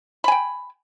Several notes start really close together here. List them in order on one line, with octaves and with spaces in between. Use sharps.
B5 G#5 G5